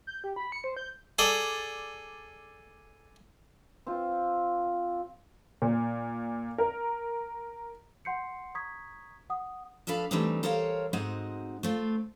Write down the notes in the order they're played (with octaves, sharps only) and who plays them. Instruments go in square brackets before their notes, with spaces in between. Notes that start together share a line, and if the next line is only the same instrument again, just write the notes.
[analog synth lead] G6
G4
B5
C#7
C5
G6
[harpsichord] G#4 A4 D5
[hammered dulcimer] C4 F4
[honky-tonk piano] A#2
A#4
[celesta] F#5 C6 G6 C7 C#7
A#5 C#6 D#6 G#6 B6
F#5 D#6
[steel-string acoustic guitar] F3 D4 A4 B4 F5
E3 G3 A3 C4 D4 D#4
A4 A#4 C5 C#5 F5 G5
G#2 G#3 C4 D#4 F#4 F#5
A3 C4 F4